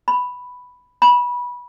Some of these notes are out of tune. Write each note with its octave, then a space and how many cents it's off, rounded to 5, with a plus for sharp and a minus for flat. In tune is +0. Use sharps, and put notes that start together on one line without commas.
B5 +5
B5 -20